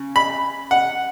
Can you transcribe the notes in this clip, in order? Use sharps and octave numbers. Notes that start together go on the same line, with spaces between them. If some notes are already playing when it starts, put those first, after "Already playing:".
Already playing: C#3
B5
F#5